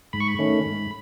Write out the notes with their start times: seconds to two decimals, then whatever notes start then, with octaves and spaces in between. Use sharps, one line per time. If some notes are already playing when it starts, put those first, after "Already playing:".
0.13 G#2 B5
0.20 C#6
0.28 B5
0.39 D#3 A3 C#4
0.66 G#2